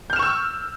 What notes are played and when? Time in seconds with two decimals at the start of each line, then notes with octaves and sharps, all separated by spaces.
0.10 G6
0.13 F6
0.16 E7
0.19 C#6
0.23 E6